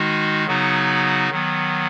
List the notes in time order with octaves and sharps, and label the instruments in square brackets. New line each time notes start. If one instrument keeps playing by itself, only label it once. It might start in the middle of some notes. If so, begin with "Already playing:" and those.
Already playing: [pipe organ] D#3 G#3 D#4 F#4
C#3 F#3 B3 D#4 F#4
D#3 F#3 B3